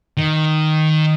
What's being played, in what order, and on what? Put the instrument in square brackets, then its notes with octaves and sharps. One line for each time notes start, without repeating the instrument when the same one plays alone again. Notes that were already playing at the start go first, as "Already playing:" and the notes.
[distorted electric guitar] D#3